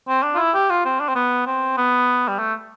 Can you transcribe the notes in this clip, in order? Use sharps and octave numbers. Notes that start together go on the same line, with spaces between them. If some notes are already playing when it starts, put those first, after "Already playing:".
C4
D4
F4
E4
G4
F4
C4
D4
C4
B3
C4
B3
G3
A3